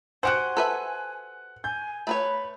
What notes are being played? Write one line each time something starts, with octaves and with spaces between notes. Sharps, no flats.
F#4 G4 C5 F#5 G#5 F#6
A4 B4 E5
G#5 G6
A3 B4 C#5 B5